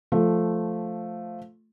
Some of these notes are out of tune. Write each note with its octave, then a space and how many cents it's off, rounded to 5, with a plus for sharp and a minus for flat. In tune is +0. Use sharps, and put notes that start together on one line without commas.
F3 +0 A3 +0